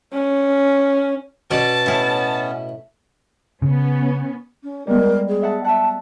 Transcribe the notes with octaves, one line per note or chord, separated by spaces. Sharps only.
C#4
B2 C#4 D5 A5
A2 B3 C#4 E4
C#3 B3 C#4
C#4
G3 G#3 B3 A#4
G#4
E5 F#5 A5
E5 F#5 A5